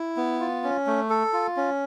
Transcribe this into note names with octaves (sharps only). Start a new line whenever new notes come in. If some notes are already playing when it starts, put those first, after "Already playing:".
Already playing: E4
B3
F4
C#4
A3
A4
F4
C#4